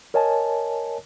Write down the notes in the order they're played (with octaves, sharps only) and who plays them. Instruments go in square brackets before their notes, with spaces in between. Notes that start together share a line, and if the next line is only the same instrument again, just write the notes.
[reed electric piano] A#4 C#5 D#5 G#5 A5